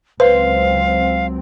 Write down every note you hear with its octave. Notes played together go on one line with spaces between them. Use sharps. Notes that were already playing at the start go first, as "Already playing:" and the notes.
C#2 F#3 C4 B4 C5 F5